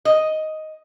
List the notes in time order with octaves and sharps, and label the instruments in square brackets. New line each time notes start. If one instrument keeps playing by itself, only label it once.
[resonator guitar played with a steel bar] D#5